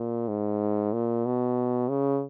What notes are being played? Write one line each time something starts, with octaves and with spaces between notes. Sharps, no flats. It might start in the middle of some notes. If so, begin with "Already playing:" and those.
Already playing: A#2
G#2
A#2
B2
C#3